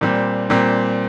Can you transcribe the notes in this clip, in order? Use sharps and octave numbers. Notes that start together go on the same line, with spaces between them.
A#2 G3 C4
A#2 G3 C4